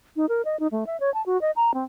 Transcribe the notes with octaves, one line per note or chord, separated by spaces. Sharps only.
D#4
A#4
D#5
D#4
A3
E5
C#5
A5
F#4
D#5
A#5
C4